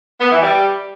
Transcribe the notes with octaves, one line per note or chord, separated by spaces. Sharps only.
B3
E3
G3